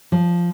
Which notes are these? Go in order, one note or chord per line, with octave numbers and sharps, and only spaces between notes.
F3